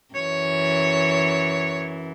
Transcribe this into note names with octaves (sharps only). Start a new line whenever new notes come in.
F#2 E3 C#5